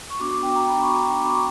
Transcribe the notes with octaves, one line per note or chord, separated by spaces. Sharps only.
C#6
B3 D4 F#4 D6
G5
A#5
B5
C#6
D6
C#6